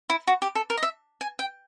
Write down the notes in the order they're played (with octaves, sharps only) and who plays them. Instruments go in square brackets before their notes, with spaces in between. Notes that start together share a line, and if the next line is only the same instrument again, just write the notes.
[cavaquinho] E4
F#4
G4
A4
A#4
D#5
E5
G#5
G5